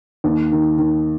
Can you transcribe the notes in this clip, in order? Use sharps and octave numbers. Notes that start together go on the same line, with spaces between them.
D#2
D#3
D#3